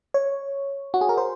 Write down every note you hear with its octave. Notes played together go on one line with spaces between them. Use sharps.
C#5
F#4
G#4
A#4
C5